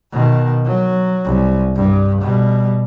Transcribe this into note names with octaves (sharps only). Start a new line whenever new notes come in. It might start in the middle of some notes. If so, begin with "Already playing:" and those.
B2 D#3
F#3
C2
G2
B2 G3